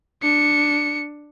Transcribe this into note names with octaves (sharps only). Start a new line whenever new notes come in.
D4 C#7